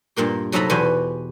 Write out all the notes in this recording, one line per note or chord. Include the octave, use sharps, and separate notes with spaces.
G2 A#2 A#3 G4
C3 F#3 D#4 A4 A#5 B5
E2 B2 G4 B4 C5 G#5